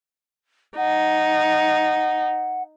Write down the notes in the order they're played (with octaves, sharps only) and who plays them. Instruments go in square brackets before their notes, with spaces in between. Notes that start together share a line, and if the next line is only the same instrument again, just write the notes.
[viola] D#4 [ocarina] F#5